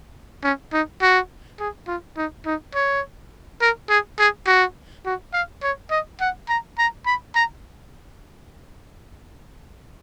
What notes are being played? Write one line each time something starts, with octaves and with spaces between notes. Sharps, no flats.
C#4
D#4
F#4
G#4
F4
D#4
D#4
C#5
A#4
G#4
G#4
F#4
F#4
F5
C#5
D#5
F#5
A#5
A#5
B5
A#5